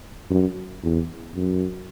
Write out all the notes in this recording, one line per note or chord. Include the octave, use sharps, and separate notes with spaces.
F#2
E2
F#2